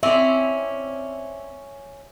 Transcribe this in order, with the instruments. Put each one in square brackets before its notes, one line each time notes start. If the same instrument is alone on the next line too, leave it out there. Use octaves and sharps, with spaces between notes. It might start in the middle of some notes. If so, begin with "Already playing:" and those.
[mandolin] C4 E4 D5 [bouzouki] C#4 [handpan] E5